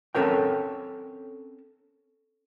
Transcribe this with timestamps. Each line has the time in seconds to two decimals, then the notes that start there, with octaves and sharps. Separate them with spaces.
0.15 C4 C#4 A4 A#4 C#5 G5